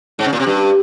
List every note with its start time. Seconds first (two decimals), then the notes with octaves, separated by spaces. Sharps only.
0.19 G#2
0.26 C#3
0.33 A#2
0.40 C3
0.47 G2